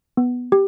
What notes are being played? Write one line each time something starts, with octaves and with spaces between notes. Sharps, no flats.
B3
G4